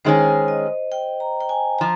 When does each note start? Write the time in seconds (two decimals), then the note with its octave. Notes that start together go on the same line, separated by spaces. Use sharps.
0.05 D#3 G#3 C#4 G#4 C5
0.48 D#5
0.92 G5
1.20 A#5
1.41 G5
1.49 G#5
1.79 F3 A#5